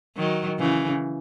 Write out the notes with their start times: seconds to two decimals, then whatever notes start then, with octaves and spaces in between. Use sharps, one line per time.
0.16 D#3 F#3
0.59 C#3 E3